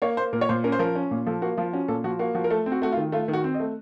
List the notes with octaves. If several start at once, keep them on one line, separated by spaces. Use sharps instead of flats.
A#3 C#5
A#3 C5
A#2 A#4
C#5
A#2 C5
C#4 A#4
C5
F3 A#4
C#4
A#2
F3 A4
A#3 F#4
F3 F4
C#4 F#4
A#2 A4
F3 F#4
A#3 F#4
F3 F#4
A#4
A3 A4
C4
F#4
A3 F#4
F4
D#3
A3 F4
D#3
F#4
C4
D#5
A3